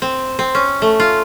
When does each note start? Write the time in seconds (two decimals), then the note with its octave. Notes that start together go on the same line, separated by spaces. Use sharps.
0.02 C4
0.39 C4
0.55 C#4
0.82 A3
1.00 F4